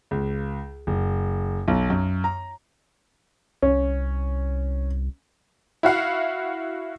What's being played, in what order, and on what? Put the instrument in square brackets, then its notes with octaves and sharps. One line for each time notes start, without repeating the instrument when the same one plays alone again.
[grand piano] C#2
F#1
B1
F#2
A#5
[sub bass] C2 [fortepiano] C#4
[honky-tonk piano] E4 F#4 F5 F#5